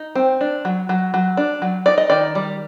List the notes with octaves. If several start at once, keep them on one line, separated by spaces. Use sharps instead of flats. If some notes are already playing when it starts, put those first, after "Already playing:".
Already playing: D#4
C4
D4
F#3
F#3
F#3
D4
F#3
D#4 D5
D#5
D#3 D5
G3